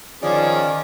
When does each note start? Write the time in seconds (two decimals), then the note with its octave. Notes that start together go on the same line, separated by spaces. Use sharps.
0.23 D#3 F3 C#4 G#4 D5